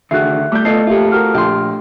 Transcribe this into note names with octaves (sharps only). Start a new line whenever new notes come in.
D3 D#3 A3 F#4 G#4 E5 F#6 C7
G3 A3 D6 G6
B3 F4 A4 D#5 C7
A#3 F4 G4 A4 E5
F#4 G4 A#4 F6
A#1 G4 C6